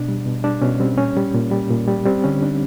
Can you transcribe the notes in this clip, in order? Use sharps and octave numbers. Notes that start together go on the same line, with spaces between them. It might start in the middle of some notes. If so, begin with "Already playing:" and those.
Already playing: B2 D4
G3
B2
G3 D4
B2 C#4
G3 C4
A#2 C#4
G3
A#2
G3
A#2
G3
G3 C4
D3 C#4
D4